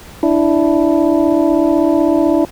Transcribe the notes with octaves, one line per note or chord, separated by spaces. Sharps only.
D4 E4